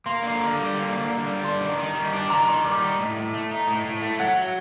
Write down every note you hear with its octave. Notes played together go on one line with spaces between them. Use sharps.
A#3 C6
D3
D3
G3
A#3
D3
D3
G3
D4 C6
D#3
D#3
G3
D4 D6
D#3 A#5
D#3 C6
G3 D6
D#4
A2
A2
A3
D#4
A2
A2
A3
F#3 F#5